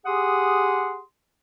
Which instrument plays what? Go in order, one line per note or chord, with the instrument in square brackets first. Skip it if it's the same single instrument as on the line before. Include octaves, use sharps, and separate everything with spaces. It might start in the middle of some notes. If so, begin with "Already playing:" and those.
[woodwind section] G4 G#4 F#5 C6 D#6